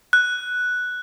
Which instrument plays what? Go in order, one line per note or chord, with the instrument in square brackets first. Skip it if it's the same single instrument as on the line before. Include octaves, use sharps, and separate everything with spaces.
[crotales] F#6